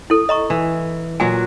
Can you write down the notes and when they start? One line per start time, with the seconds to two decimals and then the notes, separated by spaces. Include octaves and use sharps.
0.10 E4 A4
0.29 D#5 A#5 C#6
0.50 E3
1.20 A#2 F#3 F#4 G#5